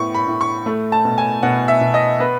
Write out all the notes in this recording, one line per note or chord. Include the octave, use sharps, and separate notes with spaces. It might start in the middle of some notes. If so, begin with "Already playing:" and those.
Already playing: A2 B3 C#6
B5
A2
C#6
A3
A5
B2
G#5
B2 F#5
E5
B2
D#5
B3 B4